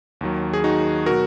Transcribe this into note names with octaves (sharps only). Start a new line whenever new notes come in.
D#2 D#3 F#3
G#4
D#4 F#4
B2 F#3 F#4 A#4